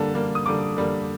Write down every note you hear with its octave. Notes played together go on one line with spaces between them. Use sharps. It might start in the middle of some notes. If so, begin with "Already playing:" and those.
Already playing: D3 G3 A#3 A5
D3 G3 A#3
D#6
D3 G3 A#3 D6
D3 G3 A#3